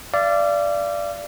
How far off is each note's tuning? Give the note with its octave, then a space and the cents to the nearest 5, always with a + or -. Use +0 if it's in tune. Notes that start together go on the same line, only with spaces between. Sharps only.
D5 -5 F5 -40